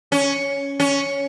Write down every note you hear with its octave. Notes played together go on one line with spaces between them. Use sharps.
C#4
C#4